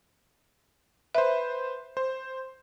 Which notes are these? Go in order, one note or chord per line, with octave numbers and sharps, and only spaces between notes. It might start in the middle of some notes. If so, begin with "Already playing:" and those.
B4 C5 E5
C5